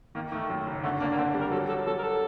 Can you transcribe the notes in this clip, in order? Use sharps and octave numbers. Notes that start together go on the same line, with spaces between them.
D#3 A#3
D#3 A3
F#2
F#1
D3 A3
A#3 D4
A#3
D3 C4
G3
A#4
F#3 A4
F#3 A4
F#3 A4
A#4
A4